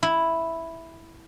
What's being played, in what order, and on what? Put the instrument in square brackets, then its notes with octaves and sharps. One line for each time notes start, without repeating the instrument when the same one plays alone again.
[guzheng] E4